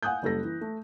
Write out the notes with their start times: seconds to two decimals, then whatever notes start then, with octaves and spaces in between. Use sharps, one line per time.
0.02 F5 F#5 G#5 D#6 F#6 G6
0.23 F#1 G3 A4 A#6
0.44 E3
0.61 A3